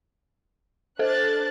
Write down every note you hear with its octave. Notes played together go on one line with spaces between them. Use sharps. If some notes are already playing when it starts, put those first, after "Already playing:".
D4 A4 C5 F#6 A6